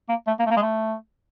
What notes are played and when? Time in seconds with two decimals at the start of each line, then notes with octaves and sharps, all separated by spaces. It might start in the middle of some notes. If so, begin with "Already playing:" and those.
0.09 A#3
0.27 A3
0.39 A#3
0.46 A3
0.50 A#3
0.57 G#3
0.62 A3